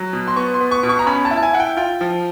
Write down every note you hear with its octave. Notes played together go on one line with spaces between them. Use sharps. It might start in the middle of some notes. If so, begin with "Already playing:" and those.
Already playing: F#3
B2
C6
B3 C#6
C6
B3
C#6
B2
C#6
A#5
C#4 B5
A5
E4
A5
G#5
E4 F#5
G5
F4 G5
F3